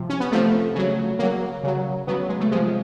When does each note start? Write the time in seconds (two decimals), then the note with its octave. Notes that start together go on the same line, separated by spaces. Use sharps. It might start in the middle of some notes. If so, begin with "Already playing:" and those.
Already playing: C3 F3
0.09 C#4
0.20 B3
0.32 C3 F3 A3
0.75 C#3 F#3
1.19 C#3 F#3 A#3
1.64 C#3 F#3
2.07 C#3 F#3 B3
2.29 G#3
2.40 A3
2.51 C3 F3 G#3